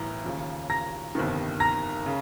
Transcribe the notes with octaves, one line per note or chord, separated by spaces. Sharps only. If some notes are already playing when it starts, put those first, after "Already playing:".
Already playing: B1 A2 E3 A#5
D#2 C#3 F3
A#5 A#6
G1 F2 C3 D#3
A#5 A#6
C#3